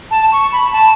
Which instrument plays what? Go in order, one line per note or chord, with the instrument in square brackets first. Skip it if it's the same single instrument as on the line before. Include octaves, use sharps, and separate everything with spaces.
[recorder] A5
C#6
B5
A5